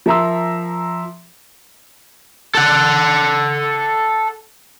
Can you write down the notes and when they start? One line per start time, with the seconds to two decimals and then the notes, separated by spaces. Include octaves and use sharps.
0.06 F3 A#4 E5 A#5 C6 E6
2.55 A4 F#5